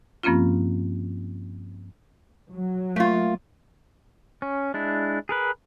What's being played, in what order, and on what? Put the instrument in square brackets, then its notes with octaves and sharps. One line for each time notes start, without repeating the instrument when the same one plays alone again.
[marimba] G2 F3 A#3 C4 C#4 F4
[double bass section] F#3
[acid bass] A3 [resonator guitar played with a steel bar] A#3 F4
[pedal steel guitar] C#4
G#3 D4 E4
G#4 A#4 B4